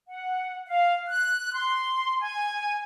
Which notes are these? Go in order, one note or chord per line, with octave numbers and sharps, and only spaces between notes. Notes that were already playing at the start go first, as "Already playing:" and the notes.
F#5
F5
F#6
C6
G#5